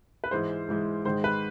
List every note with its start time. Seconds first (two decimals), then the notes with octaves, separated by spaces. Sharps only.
0.24 B4
0.31 G#2 E3 G#3 C5
0.69 G#2 E3 G#3
1.05 G#2 D#3 G#3 C5
1.24 B4